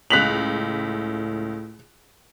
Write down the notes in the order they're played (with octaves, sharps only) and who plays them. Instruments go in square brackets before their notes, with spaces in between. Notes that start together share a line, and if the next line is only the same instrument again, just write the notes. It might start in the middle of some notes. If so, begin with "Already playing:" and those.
[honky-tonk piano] C#2 F7 [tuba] A2 [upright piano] F#6 B6 F#7